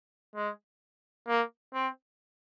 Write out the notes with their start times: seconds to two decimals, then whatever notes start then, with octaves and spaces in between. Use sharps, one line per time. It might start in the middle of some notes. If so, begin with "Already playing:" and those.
0.36 G#3
1.28 A#3
1.74 C4